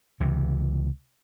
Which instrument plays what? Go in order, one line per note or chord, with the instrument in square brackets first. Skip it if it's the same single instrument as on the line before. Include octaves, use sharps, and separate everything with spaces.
[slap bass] C#2 C3 E3